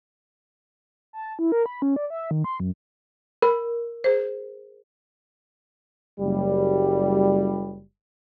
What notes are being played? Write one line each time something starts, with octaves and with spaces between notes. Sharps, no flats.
A5
E4
A#4
B5
C#4
D5
E5
D#3
C6
F#2
A#4 B5
G#4 C5
F#1 G3